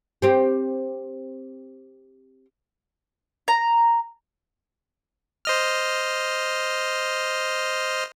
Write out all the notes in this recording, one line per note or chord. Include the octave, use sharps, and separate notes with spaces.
C4 G4
A#5
C5 D#5 F6